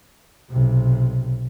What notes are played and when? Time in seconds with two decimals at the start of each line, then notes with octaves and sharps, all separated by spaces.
0.50 B1 C3